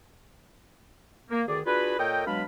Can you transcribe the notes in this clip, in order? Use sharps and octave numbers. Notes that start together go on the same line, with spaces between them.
A#3
D2 D#3 G#4 D5
D4 F4 F#4 G#4 B4
A#2 A4 A#4 C#5 D#5 G5
B2 F#3 G#3 D4 F5 B5